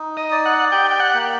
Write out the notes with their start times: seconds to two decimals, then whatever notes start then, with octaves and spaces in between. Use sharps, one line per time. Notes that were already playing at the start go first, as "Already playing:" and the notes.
Already playing: D#4
0.17 D#5
0.32 D5
0.46 F#5
0.72 G4 G5
0.91 G5
1.00 F#5
1.14 A#3